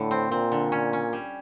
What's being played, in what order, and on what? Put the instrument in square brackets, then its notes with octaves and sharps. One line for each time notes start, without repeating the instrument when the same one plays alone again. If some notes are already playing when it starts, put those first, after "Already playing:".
Already playing: [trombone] A2 [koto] D3
[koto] C4
[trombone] A#2 [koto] C4
[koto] D3
C#4
C#4
G3